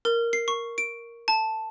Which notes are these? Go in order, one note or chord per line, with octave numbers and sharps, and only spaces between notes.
A#4
C7
C#6
D7
A5